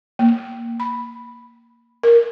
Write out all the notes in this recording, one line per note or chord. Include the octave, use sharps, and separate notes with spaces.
A#3
B5
A#4